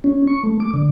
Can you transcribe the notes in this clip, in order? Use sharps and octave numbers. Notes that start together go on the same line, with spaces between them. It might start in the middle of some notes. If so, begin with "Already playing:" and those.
C#4
C#6
A3
D6
D3